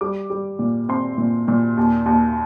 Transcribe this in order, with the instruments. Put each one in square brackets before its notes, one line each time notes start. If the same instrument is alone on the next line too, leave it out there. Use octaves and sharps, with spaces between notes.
[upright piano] G3 D6
G3
A#2
C4 C6
A#2
A#2
D#2
D#2